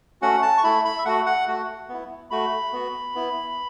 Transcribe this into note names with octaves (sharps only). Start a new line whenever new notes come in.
A3 C#4 F#4 F#5
A5
C#6
A3 E4 B5
B5
E5
A3 F#4 F#5
F#5
A3 F#4
B3 E4
A3 F#4 B5
B3 F#4
B3 E4